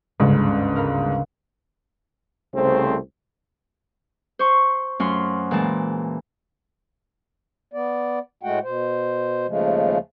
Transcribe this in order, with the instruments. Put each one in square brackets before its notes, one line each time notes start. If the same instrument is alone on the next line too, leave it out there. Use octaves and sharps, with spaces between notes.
[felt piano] G1 G#2 [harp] D2 C#3
[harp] A#4 F5 B5
[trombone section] C2 C#3 A3 C4 C5
[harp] C5 C#6
F#2 A3 F4 F#4 C6
A#2 E3 G#3 A5
[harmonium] B3 D5
A2 G#3 A3 F#4 F#5 G5
B2 C5
D#2 C#3 F3 G#3 A3